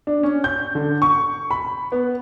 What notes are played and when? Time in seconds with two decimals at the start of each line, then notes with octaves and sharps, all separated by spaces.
0.07 D4
0.23 C#4
0.44 G6
0.75 D3
1.02 C#6
1.51 B5
1.92 B3